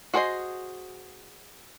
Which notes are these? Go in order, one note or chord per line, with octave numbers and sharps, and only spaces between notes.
F#4 G#4 C5 D5 D#5